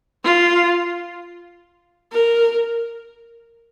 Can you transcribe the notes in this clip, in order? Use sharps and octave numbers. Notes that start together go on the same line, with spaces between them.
F4
A#4